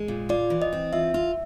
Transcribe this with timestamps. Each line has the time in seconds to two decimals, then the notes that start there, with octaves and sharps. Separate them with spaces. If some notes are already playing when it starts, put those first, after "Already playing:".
Already playing: G#3
0.08 A#2
0.29 F4 D5
0.50 E3
0.62 D#5
0.72 C4
0.93 F4 E5
1.14 F4